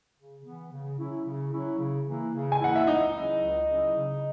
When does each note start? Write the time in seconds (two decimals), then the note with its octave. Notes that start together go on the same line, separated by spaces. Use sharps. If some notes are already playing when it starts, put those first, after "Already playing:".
0.17 C#3
0.44 E3 B3
0.71 C#3
0.99 F#3 C#4 E4
1.25 C#3
1.52 F#3 C#4 E4
1.79 C#3
2.07 E3 A#3 E4
2.34 C#3
2.52 G#5
2.60 E3 A#3 E4 F#5
2.76 E5
2.87 C#2 D#4 D#5
3.14 C#3 F#3 C#4 E4
3.42 C#2
3.68 C#3 F#3 C#4 E4
3.95 C#3